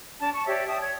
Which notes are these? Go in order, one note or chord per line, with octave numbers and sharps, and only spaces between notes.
D4 A5
A5 C#6
G4 C#5 D5 E5
E5 G5 A5 D#6
C#5 G#6